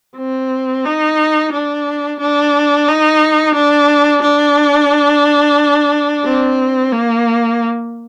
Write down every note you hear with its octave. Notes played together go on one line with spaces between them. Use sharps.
C4
D#4
D4
D4
D#4
D4
D4
C4
A#3